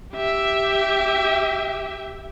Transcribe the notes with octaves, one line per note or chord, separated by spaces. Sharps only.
G4 E5